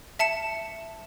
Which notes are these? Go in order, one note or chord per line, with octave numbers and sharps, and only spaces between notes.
E5 A5 C#7 E7